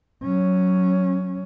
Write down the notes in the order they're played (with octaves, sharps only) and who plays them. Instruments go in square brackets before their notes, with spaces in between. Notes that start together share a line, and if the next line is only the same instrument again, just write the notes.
[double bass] F#3 C#4